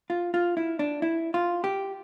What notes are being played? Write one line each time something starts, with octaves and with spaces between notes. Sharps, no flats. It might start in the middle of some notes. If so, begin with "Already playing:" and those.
F4
F4
E4
D4
E4
F4
G4